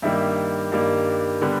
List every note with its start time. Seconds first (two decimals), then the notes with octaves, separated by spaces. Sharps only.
0.02 G2 D#3 G3 A#3 E5
0.72 G2 D#3 G3 A#3
1.41 D3 G3 B3